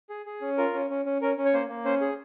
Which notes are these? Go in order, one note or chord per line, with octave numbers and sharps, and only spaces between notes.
G#4
G#4
C#4
F4 A#4
C#4
C#4
C#4
C#4 A#4
C#4
C#5
A#3 C5
A#3
C#4 C5
G#4